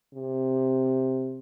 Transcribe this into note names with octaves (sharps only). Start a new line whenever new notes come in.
C3